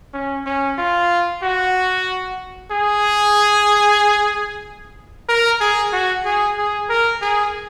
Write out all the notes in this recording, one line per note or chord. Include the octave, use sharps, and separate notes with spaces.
C#4
C#4
F4
F#4
G#4
A#4
G#4
F#4
G#4
G#4
A#4
G#4